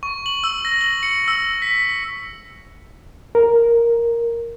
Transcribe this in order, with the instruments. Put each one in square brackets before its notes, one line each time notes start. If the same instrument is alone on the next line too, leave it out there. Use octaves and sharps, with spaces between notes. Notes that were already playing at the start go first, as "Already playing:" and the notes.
[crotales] C#6
F#7
E6
A#6
F#7
C#7
E6
B6
[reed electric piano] A#4